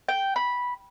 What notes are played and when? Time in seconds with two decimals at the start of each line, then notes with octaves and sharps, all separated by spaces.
0.09 G5
0.36 B5